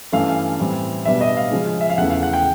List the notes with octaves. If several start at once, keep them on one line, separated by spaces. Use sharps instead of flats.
G2 E3 A3 C#4 F5
A2 E3 G3 C4
B2 G3 B3 D4 E5
D#5
F5
C#3 F3 G#3 C#4
E5
F5
E2 C#3 E3 A3 F#5
F5
F#5
G5